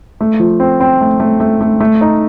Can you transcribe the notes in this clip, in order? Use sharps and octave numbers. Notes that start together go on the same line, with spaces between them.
A3
F3
C4
C4
A3
A3
A3
A3
A3
D#4